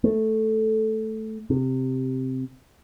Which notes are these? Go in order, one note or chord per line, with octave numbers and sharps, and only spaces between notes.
A3
C3